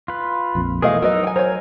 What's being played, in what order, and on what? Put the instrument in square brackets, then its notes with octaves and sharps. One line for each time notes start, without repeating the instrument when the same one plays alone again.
[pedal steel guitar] F4 B4
[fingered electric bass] A#1 F2
[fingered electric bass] B2 E3 [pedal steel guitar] A3 G#4 [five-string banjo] A#4 D#5 F5
[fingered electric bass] F#3 [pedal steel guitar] D#4 E6 [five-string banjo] A#4 B4 D#5
[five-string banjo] G5 G#5
[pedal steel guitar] A#4 G#5 [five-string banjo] C5 C#5